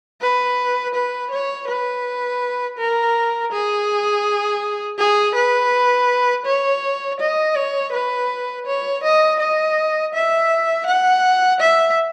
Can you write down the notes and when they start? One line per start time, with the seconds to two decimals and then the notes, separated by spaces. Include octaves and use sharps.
0.22 B4
0.94 B4
1.31 C#5
1.68 B4
2.79 A#4
3.52 G#4
4.98 G#4
5.35 B4
6.46 C#5
7.20 D#5
7.56 C#5
7.92 B4
8.67 C#5
9.03 D#5
9.40 D#5
10.14 E5
10.87 F#5
11.60 E5